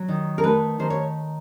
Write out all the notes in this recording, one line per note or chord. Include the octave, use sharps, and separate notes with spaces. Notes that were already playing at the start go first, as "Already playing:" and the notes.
Already playing: F#3
D#3
A#4
A3 B4
D#3 C5
C#5